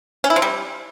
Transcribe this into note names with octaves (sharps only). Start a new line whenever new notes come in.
C#4
E4
F3
G3